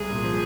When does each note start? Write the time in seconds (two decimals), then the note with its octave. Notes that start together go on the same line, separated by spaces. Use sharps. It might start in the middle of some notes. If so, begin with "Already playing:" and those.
Already playing: C2 G#3 G#4
0.10 A#2
0.24 F3